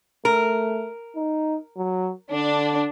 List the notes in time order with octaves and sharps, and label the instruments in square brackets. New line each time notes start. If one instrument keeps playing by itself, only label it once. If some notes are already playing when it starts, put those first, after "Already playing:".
[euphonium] A3 [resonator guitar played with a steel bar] A#4
[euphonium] D#4
F#3
[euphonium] D3 [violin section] D4